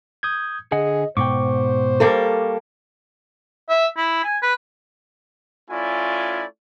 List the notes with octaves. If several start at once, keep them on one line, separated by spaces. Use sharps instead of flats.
D#6 G6 G#6
D3 G#4 D#5 F#5 G#5
G#2 B2 C5 G5 C#6 D6
G3 A#3 A4
E5
E4
G#5
B4
A3 C#4 E4 F4 D5 G#5